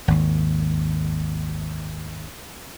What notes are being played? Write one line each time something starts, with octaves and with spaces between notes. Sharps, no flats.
G#1 D#2